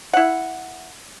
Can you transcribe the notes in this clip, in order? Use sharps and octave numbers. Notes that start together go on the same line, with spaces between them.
E4 F#5